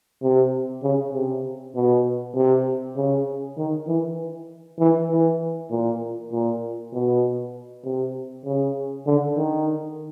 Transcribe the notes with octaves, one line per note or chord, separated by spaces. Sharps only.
C3
C#3
C3
B2
C3
C#3
D#3
E3
E3
E3
A#2
A#2
B2
C3
C#3
D3
D#3